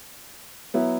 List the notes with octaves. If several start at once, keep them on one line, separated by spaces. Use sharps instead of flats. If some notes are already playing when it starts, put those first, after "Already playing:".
F#3 B3 E4